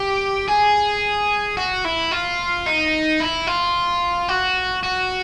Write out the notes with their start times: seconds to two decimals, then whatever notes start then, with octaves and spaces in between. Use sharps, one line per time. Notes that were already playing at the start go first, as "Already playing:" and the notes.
Already playing: G4
0.48 G#4
1.57 F#4
1.85 E4
2.11 F4
2.66 D#4
3.20 E4
3.47 F4
4.28 F#4
4.83 F#4